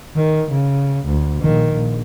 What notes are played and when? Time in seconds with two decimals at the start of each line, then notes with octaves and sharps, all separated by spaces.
0.16 D#3
0.51 C#3
1.06 D2
1.42 A#1 D#3
1.73 A#1